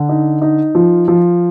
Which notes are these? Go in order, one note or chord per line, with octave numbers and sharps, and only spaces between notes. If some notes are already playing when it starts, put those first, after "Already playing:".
Already playing: D3
D#4
D#4
F3
F3